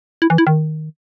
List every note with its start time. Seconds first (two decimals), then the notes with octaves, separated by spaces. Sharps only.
0.22 E4
0.30 E3
0.38 E4
0.47 D#3